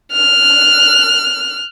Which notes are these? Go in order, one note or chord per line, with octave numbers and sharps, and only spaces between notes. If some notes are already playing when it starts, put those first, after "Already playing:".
F6 F#6